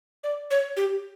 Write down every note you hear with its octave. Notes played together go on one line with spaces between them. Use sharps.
D5
C#5
G4